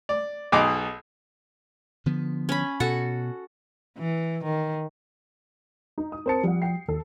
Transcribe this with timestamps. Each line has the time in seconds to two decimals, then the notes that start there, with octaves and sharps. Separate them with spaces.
0.09 D5
0.52 B1 B2 D#4 G#4 D6
2.06 D3 F3 B3
2.49 C#4 B5
2.80 B2 F#4 A4 F#5
3.99 E3
4.44 D#3
5.98 D#4
6.12 D#6
6.26 C4 A#4 C5 A5 C#7
6.44 F3 G3 F#5
6.62 G5 C7
6.88 D#2 A4